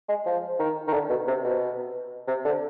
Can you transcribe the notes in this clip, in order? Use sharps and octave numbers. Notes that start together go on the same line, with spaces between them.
G#3
F3
D#3
D#3
D3
B2
C3
B2
C3
D3